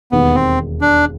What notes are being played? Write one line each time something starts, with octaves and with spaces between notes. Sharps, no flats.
E1 D#2 D#3 B3
C4
D4